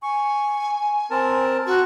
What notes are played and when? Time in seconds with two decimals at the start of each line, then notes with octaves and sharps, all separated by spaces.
0.03 G#5 C#6
1.11 C4 A#4 A5
1.66 F#4